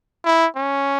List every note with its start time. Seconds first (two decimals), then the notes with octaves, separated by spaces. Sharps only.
0.25 E4
0.56 C#4